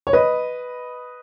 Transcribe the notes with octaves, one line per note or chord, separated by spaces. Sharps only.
C#5
B4 D#5